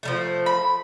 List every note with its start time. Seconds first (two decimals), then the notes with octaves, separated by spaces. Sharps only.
0.03 F3 G3 A3
0.46 B5